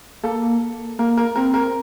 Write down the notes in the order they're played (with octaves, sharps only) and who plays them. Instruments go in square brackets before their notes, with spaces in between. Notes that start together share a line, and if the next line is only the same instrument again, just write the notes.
[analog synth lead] A#3 [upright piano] A4
[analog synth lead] A#3 [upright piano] A#4
[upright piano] A#4
[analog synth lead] C4 [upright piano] A#4
[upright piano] A#4